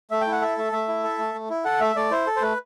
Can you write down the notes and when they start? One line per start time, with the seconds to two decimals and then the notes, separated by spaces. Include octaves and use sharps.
0.11 A3 E5
0.21 G5
0.27 E4
0.32 F#5
0.42 A4 E5
0.58 A3 E5
0.72 A3 E5
0.88 E4
1.04 A4
1.19 A3
1.34 A3
1.50 E4
1.65 A4 F#5
1.80 A3 E5
1.96 A3 D5
2.11 E4 C5
2.27 A4
2.36 C5
2.42 A3 B4